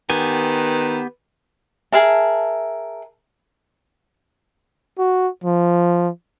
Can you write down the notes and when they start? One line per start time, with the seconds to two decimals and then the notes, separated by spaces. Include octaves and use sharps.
0.10 D#3 B3 G4 B4 G#5
1.92 G#4 A#4 E5 A5
4.98 F#4
5.44 F3